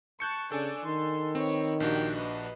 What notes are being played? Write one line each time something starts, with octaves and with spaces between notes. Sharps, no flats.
A5 C#6 F#6 G6 C#7
C#3 D4 A4 D5 G#5
D#3 C6
C4 B4 C#5
A#1 D4 F#4 G4 G5
B4 D#5